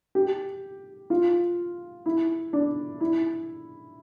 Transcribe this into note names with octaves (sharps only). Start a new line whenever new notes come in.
G4
F4
E4
D4
E4